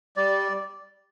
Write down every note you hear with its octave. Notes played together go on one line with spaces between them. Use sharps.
G3 D5